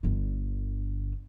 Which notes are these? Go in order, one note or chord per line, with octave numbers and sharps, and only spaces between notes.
G1 D3